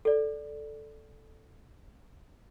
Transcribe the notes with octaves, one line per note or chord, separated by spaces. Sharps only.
A4 D5